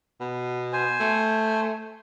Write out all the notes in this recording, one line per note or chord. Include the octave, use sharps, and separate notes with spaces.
B2
C5 G#5
A3